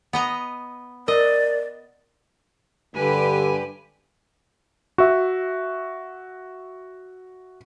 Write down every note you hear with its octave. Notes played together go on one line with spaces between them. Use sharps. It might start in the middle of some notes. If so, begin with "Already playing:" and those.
B3 D#5 A#5
A#4 D5 D#5
G2 D3 G4 B4 G#5
F#4 E5